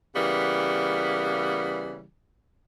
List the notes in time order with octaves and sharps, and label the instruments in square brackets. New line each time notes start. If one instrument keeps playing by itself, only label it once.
[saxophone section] C#3 E3 G3 A#3 B3